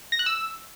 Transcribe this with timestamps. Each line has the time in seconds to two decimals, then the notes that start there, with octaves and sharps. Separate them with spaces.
0.12 A#6
0.19 F#6
0.26 E6